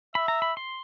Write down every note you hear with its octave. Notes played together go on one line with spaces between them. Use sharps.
E5 B5
A#5
B5
C6